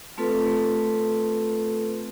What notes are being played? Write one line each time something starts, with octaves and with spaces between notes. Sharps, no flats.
A3 C4 F4 A4 B4